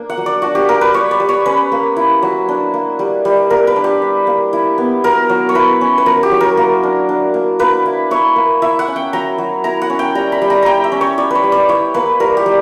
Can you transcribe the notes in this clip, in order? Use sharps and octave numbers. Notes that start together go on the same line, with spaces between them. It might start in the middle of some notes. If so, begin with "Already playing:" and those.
Already playing: A#3 D4
F#5
F#3
D5
D4 F#4
G4
A#3 A#4
B4
G3 C#5
D5
G3
C#5
C#4 B4
A#3
E4
F#3
D4
A#3
G3
G3
A#3 A#4
B4
D4
G4
D4
A#3
E4
B3
F#3 A#4
F#3
C#5
E4 B4
C#4
B4
F#3 A#4
G4
F#3
A#4
A#3
D4
D4
A#3
A#3 B4
E4
E4 C#5
A#3
E4 E5
F#5
C#4
G5
F#3 A#5
F#3
E4 A#5
F#5
C#4
G5
G3 A#5
B5
G3
A#5
E4 G5 A#5
E5
C#4
C#5
G3 D5
B4 C#5
G3
D5
E4 C#5
A#3 B4
G3 A#4
G4
G3